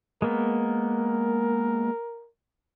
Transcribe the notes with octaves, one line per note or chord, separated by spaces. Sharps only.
G#3 A#3 B3 A#4